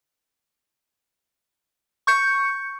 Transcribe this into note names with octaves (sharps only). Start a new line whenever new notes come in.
C#6 G6 C#7